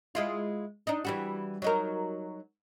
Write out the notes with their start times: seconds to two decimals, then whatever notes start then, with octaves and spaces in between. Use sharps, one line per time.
0.15 G#3 E4 F4
0.87 D4 D#4
1.05 E3 G3 F#4
1.62 F#3 D#4 A#4